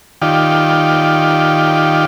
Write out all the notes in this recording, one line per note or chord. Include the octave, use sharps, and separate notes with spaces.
D#3 F4 G4 D5